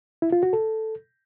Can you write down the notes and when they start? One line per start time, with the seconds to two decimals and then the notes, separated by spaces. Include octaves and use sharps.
0.22 E4
0.32 F4
0.43 F#4
0.53 A4